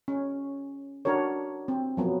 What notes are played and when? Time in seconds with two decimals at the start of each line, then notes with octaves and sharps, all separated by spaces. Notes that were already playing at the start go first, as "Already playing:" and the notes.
0.08 C#4
1.05 D4 F#4 A#4 C#5
1.68 C4
1.97 F3 F#3 B3